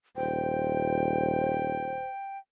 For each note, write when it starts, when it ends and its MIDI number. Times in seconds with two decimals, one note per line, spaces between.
0.16 2.04 27
0.16 2.04 72
0.16 2.38 79